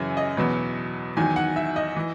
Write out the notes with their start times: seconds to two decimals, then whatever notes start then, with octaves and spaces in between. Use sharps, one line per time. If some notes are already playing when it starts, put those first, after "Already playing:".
Already playing: F#2 C#3 E3 G#5
0.17 D#5
0.37 E2 B2 F#3 B4
1.17 E2 D#3 F#3 G#5
1.36 F#5
1.56 E5
1.76 D#5
1.96 E3